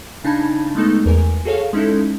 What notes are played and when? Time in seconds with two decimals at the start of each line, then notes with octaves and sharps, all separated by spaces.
0.24 C#3 D4 D#4 A5 B5 G#6
0.75 G#3 A3 B3 D#4 A4
1.06 E2 A#4 G#5
1.45 F#4 G#4 A4 C#5 F5
1.73 G#3 C#4 D#4 E4 A4